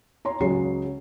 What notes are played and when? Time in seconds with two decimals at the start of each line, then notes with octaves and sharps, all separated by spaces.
0.25 C#5 A#5 C6
0.40 C#2 C#3 F#3 G#3 C#5 C7